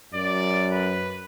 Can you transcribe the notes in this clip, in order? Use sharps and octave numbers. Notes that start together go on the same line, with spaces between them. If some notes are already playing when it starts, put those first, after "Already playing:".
F#2 D5
B4